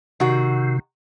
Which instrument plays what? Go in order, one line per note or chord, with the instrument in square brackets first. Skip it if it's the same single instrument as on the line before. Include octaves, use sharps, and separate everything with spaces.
[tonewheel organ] C3 [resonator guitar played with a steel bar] D#3 F#4